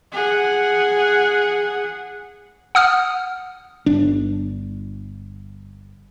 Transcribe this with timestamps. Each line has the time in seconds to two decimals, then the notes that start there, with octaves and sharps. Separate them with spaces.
0.12 G#4 F#5
2.75 F#5 D#6 F6
3.86 G1 D4